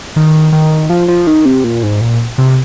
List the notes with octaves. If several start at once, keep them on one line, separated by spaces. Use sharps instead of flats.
D#3
D#3
F3
F3
D#3
C3
A#2
G#2
A#2
C3